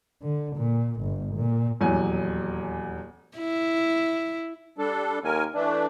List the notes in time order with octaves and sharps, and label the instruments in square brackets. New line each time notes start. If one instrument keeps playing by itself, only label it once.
[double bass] D3
A#2
G1
A#2
[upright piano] D#1 E2 F#3 G#5
[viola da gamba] E4
[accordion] G3 D4 A4
[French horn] D#2 [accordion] A#4 G#5
[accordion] E3 A3 D4 [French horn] D5